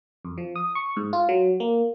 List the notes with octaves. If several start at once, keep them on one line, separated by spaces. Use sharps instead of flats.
F2
F3
D#6
C#6
G#2
F4
F#3
A#3